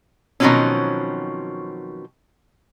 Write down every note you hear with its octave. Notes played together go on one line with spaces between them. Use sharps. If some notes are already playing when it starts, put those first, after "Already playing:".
B2 D#3 F3 F#3 C4 C#4